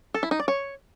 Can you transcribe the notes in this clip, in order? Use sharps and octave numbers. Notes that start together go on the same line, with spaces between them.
A4
E4
D#4
D5
C#5